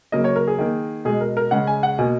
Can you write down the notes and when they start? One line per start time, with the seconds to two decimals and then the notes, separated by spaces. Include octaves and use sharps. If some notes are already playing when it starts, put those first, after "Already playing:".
0.12 C#3 F#3 A#3 D#5
0.24 C#5
0.36 A#4
0.47 G#4
0.59 D#3 A#3
1.05 B2 G#3 G#4
1.21 A#4
1.37 A#4
1.51 C#3 G#3 F#5
1.67 G#5
1.83 F#5
1.98 B2 A#3 G#5